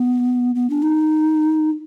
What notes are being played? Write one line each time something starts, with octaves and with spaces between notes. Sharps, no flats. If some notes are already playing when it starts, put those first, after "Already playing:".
Already playing: B3
B3
D4
D#4